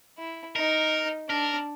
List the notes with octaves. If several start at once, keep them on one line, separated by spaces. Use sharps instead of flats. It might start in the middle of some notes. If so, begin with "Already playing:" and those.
E4
D#4 A#4
D4 A#4